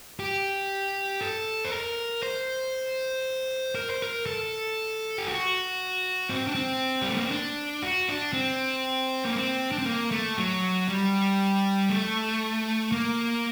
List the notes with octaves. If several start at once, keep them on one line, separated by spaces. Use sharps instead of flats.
G4
A4
C5
A#4
C5
A#4
C5
A#4
A4
G4
F#4
C4
D4
C4
G3
A3
A#3
C4
D4
F#4
D4
C4
A#3
C4
D4
C4
A#3
A3
F#3
G3
A3
A#3